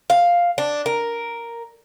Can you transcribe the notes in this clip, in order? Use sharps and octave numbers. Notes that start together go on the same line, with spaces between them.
F5
D4
A#4